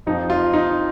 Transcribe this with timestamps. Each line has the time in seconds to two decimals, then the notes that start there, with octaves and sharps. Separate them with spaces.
0.06 F2 F3 D#4
0.30 F4
0.53 D#4